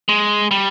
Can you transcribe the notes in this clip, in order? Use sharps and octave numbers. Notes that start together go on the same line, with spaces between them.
G#3
G3